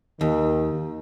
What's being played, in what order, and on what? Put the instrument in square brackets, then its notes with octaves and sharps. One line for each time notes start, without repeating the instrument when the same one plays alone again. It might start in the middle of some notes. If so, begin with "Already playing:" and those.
[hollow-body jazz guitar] D#2 [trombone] D#3